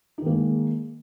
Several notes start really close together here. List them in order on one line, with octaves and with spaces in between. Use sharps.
D#4 D#3 A#3 G#3